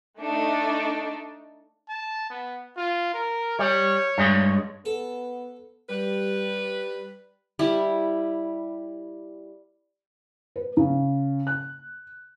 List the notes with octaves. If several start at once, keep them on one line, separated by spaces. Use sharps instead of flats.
A3 D4 D#4
A5
B3
F4
A#4
G3 C#5
G2 G#3
B3 A4
G3 B4
G3 E4
B4
C#3
F#6